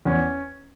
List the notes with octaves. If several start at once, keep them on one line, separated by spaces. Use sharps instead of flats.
E2 C#4